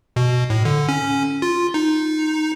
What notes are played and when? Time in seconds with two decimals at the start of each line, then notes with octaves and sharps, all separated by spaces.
0.16 B2
0.50 A2
0.65 D3
0.89 C#4
1.42 F4
1.74 D#4